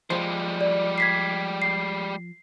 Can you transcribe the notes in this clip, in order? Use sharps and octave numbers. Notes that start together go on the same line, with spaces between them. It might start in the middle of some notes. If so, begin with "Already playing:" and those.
F3 G3 G#3 C5
D5
G#6 B6 C7
C7